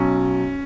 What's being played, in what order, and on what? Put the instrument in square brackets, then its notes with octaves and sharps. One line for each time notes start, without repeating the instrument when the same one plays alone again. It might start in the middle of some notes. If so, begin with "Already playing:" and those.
Already playing: [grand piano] B1 B2 F#3 C#4